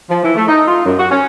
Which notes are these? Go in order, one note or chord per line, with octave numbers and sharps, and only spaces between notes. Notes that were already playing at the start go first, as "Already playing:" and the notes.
F3
E3
A3
D#4
F4
F#2
F#4
C#4